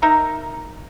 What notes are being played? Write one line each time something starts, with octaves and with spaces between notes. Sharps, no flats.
D#4 A#4 E5 A#5